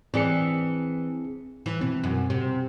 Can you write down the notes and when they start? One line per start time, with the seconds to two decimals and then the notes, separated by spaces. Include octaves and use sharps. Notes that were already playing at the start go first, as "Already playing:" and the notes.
0.14 E3 C4 D4 G#4 C#7
1.66 E3
1.81 B2 E3 C4
2.04 F#2
2.30 C3